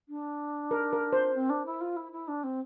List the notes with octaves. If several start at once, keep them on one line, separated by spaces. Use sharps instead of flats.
D4
A#4
A#4
C5
C4
D4
E4
F4
E4
E4
D4
C4